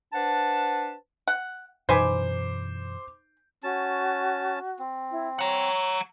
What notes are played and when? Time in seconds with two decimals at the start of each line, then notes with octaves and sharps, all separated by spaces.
0.13 D4 B4 C5 F#5 A5
1.28 F#5
1.89 F#2 B2 E3 D#4 B4 C5 G#5 D6
3.63 C#4 F#4 A5
4.79 C4
5.11 E4
5.39 C#5 F#5 A#5